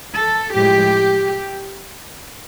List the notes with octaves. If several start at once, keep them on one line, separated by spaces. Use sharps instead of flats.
A4
A2 F3 G#3 G4